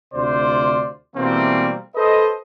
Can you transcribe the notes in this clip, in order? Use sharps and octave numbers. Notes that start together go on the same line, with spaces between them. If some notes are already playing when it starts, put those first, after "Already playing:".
D2 C3 F4 C5 D5
B2 E3 G3 A3 A#3 C4
A4 B4 C5 D#5